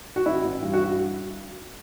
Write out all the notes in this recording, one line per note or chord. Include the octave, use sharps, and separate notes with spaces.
F#4
A1 E4
A1
G2
F#4